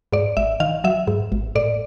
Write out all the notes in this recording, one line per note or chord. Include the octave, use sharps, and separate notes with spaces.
G#2 D5
G#1 E5
D#3 F5
F#3 E5
G#2
G#1
A2 D5